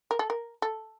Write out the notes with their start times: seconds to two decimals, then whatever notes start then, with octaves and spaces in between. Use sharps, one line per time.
0.11 A#4
0.19 A4
0.30 A#4
0.62 A4